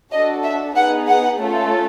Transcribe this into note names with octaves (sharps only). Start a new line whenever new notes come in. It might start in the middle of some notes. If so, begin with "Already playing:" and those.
D4 F#4 A4 D#5
E5
B3 D#4 G#4 F#5
F#5
A3 C#4 F4 A4